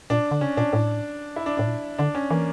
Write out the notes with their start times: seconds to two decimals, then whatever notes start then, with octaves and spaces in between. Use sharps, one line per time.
0.10 A#2 D4
0.31 D3
0.41 C#3 C#4
0.57 A#2 D4
0.73 A2
1.36 E4
1.46 D4
1.57 A2 D4
1.67 A#2
1.98 D3 D4
2.15 C#4
2.31 E3 A#3